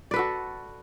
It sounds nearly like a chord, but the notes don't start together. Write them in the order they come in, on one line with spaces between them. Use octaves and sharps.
D5 B4 A4 F#4